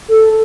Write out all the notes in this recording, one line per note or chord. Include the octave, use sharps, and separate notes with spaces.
A4